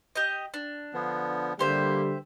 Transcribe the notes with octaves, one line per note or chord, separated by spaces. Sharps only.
G4 D#5
D4
D3 F3 B3
D3 G3 A#3 G4 C5 E5